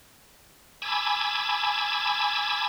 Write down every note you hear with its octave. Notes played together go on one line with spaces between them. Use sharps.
G#5 A5 B5 D6 E6 G#6